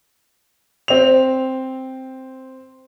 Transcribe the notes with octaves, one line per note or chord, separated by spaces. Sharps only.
C4 F7